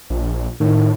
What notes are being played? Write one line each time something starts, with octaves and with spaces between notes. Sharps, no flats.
A#1
A2 D#3